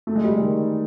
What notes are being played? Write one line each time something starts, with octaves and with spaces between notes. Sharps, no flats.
A3
G#3
G3
G#3
D#3